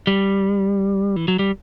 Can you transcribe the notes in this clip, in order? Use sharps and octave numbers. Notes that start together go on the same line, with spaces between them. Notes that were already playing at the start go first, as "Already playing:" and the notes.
G3
E3
F#3
G3